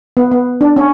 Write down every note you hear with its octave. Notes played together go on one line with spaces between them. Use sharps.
B3
B3
D4
C#4